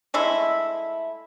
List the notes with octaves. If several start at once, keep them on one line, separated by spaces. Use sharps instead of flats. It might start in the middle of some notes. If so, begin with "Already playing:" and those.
G#3 A3 E4